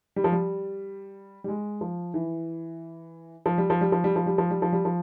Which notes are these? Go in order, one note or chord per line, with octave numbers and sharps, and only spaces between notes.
G3
F3
G3
G3
G#3
F3
E3
F3
G3
F3
G3
F3
G3
F3
G3
F3
G3
F3
G3
F3